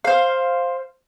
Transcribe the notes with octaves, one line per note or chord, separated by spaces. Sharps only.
C5 F5